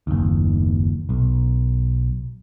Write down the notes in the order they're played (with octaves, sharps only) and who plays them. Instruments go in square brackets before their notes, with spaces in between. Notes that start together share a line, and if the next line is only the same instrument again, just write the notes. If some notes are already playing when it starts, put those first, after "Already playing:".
[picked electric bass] F#1 D#2
B1